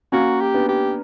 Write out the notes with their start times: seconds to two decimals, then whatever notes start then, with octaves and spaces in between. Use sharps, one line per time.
0.12 A#3 C#4 F#4
0.41 G4
0.54 B3 D4
0.69 G4